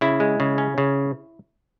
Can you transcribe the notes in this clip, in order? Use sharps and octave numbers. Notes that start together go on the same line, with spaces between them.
C#3 E4
G#3
C#3
C#4
C#3